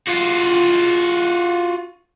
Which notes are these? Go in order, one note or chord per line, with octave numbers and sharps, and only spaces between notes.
F4 F#4